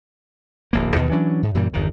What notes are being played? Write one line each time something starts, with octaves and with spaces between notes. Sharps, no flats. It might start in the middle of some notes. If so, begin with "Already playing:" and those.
D1 A#1 A#3
D#2 B2 D#3 E3
E3 F#3 C#4 D4
G#2
F#2 A#2 E3 G3
G1 E2 D#3